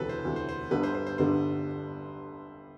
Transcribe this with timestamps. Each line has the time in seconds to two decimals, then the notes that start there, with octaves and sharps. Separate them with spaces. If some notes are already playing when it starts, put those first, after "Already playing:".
Already playing: E1 D2 C3 E3 A4 B4
0.09 C5
0.25 E1 D2 C3 E3
0.36 C5
0.49 C5
0.71 G1 G2 D3 G3 B3 B4
0.83 C5
0.95 C5
1.07 C5
1.18 G1 G2 D3 G3 B3 C5